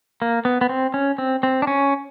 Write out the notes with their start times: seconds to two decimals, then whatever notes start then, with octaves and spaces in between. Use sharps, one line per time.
0.22 A#3
0.45 B3
0.61 B3
0.69 C4
0.94 C#4
1.18 C4
1.43 C4
1.62 D4
1.67 C#4